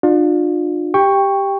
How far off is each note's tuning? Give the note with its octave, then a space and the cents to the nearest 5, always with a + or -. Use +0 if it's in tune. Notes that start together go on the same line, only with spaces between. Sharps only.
D4 +40 F4 +30
G4 +0 G5 +15 C#6 +0